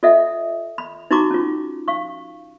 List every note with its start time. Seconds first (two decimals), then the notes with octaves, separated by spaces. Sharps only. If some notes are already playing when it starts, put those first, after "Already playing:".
0.03 F4 A4 D#5 E5 F#5
0.78 B5
1.11 D#4 E4 F#4 A#5 C#6 D6
1.31 C#4 F4
1.88 F5 C#6